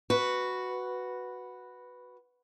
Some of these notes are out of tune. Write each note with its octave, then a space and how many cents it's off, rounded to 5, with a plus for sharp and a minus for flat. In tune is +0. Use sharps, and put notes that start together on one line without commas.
F#4 +0 B4 +0